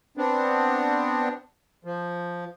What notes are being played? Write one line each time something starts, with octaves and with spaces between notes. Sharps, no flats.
B3 C4 D4
F3